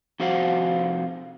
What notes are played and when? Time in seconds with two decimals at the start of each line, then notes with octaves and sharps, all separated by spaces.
0.20 C3 F3 F#4 C5 F5 F#5